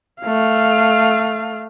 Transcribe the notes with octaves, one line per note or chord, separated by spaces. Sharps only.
A3 F5